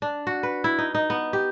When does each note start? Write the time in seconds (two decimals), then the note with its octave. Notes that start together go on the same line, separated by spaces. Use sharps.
0.02 D4
0.27 F#4
0.43 B4
0.64 E4
0.78 D#4
0.95 D#4
1.10 B3
1.33 G4